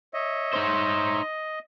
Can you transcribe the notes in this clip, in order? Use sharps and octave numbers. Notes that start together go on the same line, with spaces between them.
C#5 D#5 E5
D#4 C5